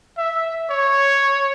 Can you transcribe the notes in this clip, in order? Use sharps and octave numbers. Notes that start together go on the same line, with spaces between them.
E5
C#5